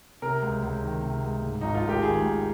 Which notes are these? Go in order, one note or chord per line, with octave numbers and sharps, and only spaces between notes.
C3 A#4
C#2
C#2
D#3
C3
C#2
G#2
G#1 D#4
F4
G#1
G4
D#3 G#4
G#2